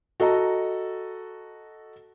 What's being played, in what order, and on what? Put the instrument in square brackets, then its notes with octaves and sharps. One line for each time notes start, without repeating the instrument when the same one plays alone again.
[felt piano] F#4 A4 D#5 A#5